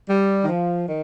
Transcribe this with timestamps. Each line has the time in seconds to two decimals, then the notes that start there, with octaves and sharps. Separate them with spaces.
0.09 G3
0.43 D#3
0.47 F3
0.86 D#3